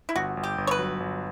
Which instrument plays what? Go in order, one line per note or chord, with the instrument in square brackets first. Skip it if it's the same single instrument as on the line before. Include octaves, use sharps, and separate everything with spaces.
[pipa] E4
[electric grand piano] G1 [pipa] F#4
[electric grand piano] G1
[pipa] G4
[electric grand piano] G1
[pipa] C#5
B4
[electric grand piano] F#3
G1